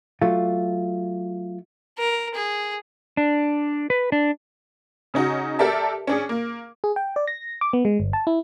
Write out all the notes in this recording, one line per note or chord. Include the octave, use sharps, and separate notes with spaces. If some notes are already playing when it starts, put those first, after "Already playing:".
F#3 A3 F4
A#4
G#4
D4
B4
D4
C#3 C#4 D#4 F#4
G4 A4 A#4 D5 E5 A5
C#4 D4 G#4
A#3
G#4
G5
D5
A#6
D6
B3
G#3
G1
A5
E4